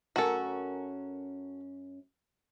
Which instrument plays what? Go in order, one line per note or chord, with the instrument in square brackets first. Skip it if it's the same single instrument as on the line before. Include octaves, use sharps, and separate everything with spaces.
[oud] F#2 C#4 A#4 [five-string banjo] F#4 A4